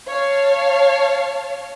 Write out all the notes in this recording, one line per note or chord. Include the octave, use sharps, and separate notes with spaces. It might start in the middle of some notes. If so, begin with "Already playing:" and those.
C#5 F5 A5